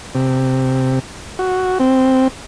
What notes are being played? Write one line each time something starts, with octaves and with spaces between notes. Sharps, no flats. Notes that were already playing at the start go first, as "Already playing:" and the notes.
C3
F#4
C4